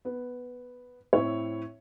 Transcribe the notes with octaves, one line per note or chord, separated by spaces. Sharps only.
B3
A2 C4 E4 C#5